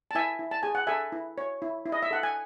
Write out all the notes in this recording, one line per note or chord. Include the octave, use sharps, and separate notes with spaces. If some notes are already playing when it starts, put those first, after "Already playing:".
A5
E4 E5 G#5
E4
A5
G#4 G#5
F#5
A4 E5 G#5
E4
C#5
E4
E4
D#5
E5
A4 F#5
G#5